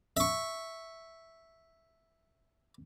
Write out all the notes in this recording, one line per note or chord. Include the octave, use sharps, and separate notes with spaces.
E5 C#6